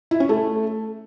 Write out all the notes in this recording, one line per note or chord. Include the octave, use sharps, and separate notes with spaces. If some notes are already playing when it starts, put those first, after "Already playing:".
E4
C#4
A3